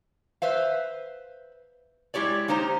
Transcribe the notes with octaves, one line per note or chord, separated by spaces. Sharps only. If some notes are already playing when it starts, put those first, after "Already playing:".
B4 C5 E5 F5
G#3 E4 G4 C#5 D5
A#3 D#4 G4 C5 A#5